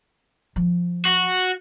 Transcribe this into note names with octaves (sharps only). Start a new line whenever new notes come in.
F3
F#4